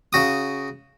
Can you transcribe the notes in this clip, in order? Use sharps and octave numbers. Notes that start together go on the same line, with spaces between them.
C#3 F#4 D#6